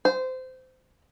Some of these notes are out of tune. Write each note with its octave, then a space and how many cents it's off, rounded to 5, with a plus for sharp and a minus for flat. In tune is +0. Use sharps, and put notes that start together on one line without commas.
C5 -20